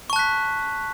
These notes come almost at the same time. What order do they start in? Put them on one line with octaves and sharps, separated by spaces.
C#6 A5 F#6 B6